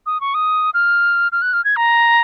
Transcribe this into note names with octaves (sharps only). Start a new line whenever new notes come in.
D#6
C#6
D#6
F6
F6
F#6
F6
G#6
A#5